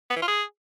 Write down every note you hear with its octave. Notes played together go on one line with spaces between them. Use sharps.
B3
E3
F4
G#4